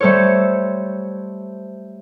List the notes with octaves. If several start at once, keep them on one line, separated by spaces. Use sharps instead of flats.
G3 A3 A4 C5 C#5